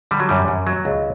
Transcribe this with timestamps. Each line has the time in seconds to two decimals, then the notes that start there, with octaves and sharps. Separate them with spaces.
0.11 D3 G3
0.20 F#3
0.29 F#2 G3
0.48 F#2
0.67 F#3
0.85 C#2